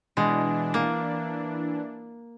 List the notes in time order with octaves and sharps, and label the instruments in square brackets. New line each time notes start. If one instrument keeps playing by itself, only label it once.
[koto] B2 G#3 [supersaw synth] E3 D4
[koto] A#3